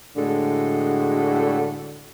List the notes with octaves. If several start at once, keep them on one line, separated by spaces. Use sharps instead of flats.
A2 D3 G#3 F#4 A4